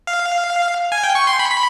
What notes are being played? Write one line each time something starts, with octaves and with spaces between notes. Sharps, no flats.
F5
G#5
G5
C#6
C6
B5
B5